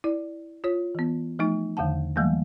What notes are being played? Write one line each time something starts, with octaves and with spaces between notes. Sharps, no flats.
E4 D5
F4 C#5
E3 B3
F3 A3 D#4
E2 D3 D#3 F#5 A5
E3 F#3 G3 A3 A#3